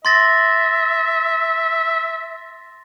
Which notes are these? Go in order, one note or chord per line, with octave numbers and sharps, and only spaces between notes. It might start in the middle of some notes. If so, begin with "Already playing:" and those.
E5 C6 A6 A#6